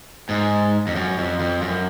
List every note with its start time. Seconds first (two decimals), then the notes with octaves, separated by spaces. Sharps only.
0.29 G#2
0.87 F2
0.95 F#2
1.18 F2
1.40 F2
1.62 F#2